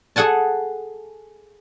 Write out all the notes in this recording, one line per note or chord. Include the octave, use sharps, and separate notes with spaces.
G#4 A4 F#5 G#5 A5